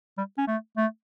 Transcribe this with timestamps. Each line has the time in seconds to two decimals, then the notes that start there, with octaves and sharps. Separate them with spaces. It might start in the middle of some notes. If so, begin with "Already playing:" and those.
0.18 G3
0.38 C#4
0.48 A3
0.77 A3